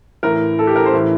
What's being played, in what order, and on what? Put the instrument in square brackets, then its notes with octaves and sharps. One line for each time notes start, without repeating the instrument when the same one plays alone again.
[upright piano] A2 E3 A#4
A4
G4
A#4
C5
A2 E3